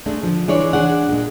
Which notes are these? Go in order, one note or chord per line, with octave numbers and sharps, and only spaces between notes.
G#3 A3 D4
D3 F3
E3 G#3 D4 C#5 D5
G#3 D4 G#4 F#5
A#2 G#3